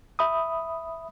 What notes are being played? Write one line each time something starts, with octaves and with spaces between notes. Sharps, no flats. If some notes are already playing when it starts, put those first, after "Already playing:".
E5 B5 D#6